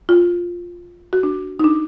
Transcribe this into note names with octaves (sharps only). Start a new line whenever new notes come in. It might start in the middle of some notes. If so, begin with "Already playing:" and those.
F4
F#4
D4
D#4
D4